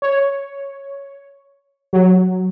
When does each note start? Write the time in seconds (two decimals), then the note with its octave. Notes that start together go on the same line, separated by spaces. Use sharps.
0.02 C#5
1.93 F#3